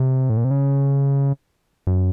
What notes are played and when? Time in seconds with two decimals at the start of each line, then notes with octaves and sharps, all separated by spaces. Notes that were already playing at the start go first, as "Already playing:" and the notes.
Already playing: C3
0.30 A2
0.37 A#2
0.44 C3
0.51 C#3
1.87 F#2